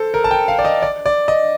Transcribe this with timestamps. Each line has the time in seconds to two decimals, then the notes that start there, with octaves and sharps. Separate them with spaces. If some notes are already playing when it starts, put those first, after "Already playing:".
Already playing: A4 C5
0.14 A#4
0.24 A5
0.31 G5
0.48 F5
0.59 D5
0.65 D#5
0.82 D5
1.06 D5
1.28 D#5